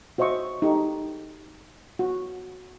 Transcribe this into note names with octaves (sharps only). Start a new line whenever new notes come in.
F#4 C5 D#5 E5 C#6
D#4 G4 A4
F#4